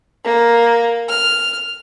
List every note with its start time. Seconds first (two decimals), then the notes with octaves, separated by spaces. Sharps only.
0.25 A#3
1.09 F6